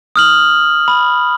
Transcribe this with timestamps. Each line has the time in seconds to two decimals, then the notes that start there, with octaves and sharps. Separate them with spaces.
0.16 D#6 F6 F#7
0.88 B5